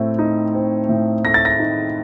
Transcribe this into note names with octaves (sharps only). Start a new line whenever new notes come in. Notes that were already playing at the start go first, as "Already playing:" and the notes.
Already playing: A2 A3 C4
D#4
C4
A2
A3 A#6
A6
A#6
D#4